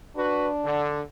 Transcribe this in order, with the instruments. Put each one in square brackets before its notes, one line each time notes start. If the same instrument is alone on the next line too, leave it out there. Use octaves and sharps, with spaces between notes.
[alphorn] D4 [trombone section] F#4 B4
[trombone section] D3